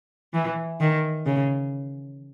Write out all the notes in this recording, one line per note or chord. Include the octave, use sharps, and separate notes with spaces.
E3
D#3
C#3